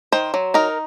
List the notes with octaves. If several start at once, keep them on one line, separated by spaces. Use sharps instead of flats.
D#3 C5
F#3
D#4 A#4